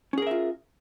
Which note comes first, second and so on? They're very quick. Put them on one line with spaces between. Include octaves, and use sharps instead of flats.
C#4 G#4 A#4 E5 F4